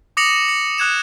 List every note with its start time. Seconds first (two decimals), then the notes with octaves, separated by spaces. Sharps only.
0.17 D6 D#6 A#6 C#7 F7 F#7
0.49 C#7
0.78 D#6 F#6 G#6 E7